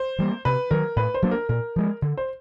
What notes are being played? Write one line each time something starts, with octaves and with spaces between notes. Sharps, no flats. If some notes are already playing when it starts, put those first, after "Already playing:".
Already playing: C5
E3 G3 A#3
C3 B4
D#3 F#3 A#4
A2 B4
C5
F#3 A#3 D4
A#4
A#2 A#4
F3 G#3
D3
C5